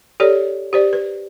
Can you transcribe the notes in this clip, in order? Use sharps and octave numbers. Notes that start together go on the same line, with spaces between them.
G4 A4 C#5 D5
G4 C5 D5
B4